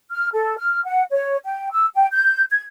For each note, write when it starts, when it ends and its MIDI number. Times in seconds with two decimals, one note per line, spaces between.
0.11 0.29 89
0.32 0.55 69
0.57 0.80 89
0.84 1.03 78
1.11 1.37 73
1.43 1.70 79
1.71 1.86 88
1.95 2.06 79
2.12 2.42 91
2.51 2.63 92